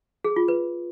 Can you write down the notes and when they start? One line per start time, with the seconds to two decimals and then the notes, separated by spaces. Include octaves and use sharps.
0.24 G#4
0.36 F4
0.48 B4